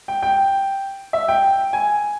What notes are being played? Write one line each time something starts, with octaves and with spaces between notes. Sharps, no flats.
G5
G5
E5
G5
G#5